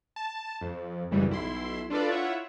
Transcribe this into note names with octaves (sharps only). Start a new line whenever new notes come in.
A5
F2
G#1 F#2 C#3 E3 G3
B1 E4 C6
D4 F4 A4 B4 D5
E4 F4 C#5 E5 F#5